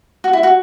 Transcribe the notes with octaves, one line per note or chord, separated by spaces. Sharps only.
F#4
E4
F#4